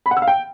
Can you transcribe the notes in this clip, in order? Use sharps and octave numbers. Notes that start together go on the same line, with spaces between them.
B5
F#5
E6
F5
G5